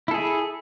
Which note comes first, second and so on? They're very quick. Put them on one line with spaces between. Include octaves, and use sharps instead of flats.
E4 A4 G#4